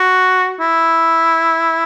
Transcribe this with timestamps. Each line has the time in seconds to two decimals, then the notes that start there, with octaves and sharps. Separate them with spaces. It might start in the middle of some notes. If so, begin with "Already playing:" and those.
Already playing: F#4
0.60 E4